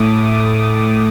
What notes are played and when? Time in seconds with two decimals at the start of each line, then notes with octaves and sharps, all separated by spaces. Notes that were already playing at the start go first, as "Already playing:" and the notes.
Already playing: A2 A3 D6 D#6
0.32 D#6
0.61 D6